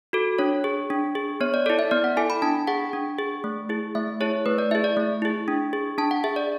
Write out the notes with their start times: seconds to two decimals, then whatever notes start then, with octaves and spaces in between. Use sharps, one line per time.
0.13 F#4 A4
0.39 D4 C#5
0.64 G#4
0.90 D4
1.15 G#4
1.40 B3 C#5
1.54 D5
1.66 E4 A4 D5
1.79 E5
1.91 B3 D5
2.04 F#5
2.17 E4 A4 G#5
2.30 B5
2.42 D4 A5
2.67 G#4 F#5
2.93 D4
3.19 G#4
3.44 A3
3.69 E4 G#4
3.95 A3 E5
4.20 E4 G#4 C#5
4.46 A3 B4
4.58 D5
4.71 E4 E5
4.75 G#4
4.84 D5
4.97 A3
5.22 E4 G#4
5.48 D4
5.73 G#4
5.98 D4 A5
6.11 F#5
6.24 G#4 E5
6.36 D5